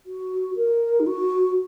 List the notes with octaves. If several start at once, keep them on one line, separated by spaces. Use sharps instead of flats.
F#4
A#4
D#4
F#4